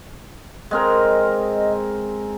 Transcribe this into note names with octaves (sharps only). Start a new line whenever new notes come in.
G#3 C4 A#4 D#5